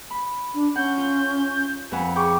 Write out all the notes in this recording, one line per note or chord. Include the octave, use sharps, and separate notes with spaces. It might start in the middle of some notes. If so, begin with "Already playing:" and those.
B5
D4
C#4 F#5 G6
F4
F2 B4 F#5 G#5
G#4 G5 C#6 D6